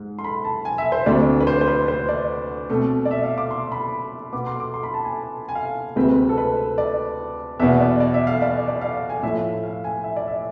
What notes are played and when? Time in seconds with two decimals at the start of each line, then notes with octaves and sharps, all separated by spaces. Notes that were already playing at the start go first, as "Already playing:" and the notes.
Already playing: G#2 G#3
0.19 C6
0.24 B5
0.45 A5
0.65 G#5
0.78 E5
0.92 C5
1.06 D2 D3 A3 C4 D5
1.40 B4
1.47 C5
1.61 C5
1.67 B4
1.88 C5
2.09 D5
2.70 B2 A3 C4
3.05 D5
3.11 E5
3.24 F5
3.38 D6
3.51 C6
3.72 B5
4.33 B2 B3 D6
4.47 C6
4.60 D6
4.74 C6
4.83 B5
4.94 A5
5.05 G#5
5.49 G#5
5.55 F5
5.96 D2 C3 G#3 C4 B4
6.29 A4
6.38 B4
6.78 D5
7.59 E2 B2 B3 E5
7.81 D5
8.00 D5
8.14 E5
8.27 F5
8.42 D5
8.68 D5
8.81 F5
9.10 G#5
9.23 A2 F3 A3 E5
9.64 F5
9.84 G#5
10.04 E5
10.16 D5
10.28 E5